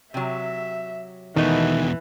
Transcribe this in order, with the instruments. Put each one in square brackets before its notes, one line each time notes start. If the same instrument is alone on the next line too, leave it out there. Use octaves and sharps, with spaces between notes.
[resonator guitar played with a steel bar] C3 F#3 [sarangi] E5
[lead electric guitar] E2 B2 [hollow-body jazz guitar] D#3 [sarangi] E3 [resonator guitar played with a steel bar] A3 D#4 F#4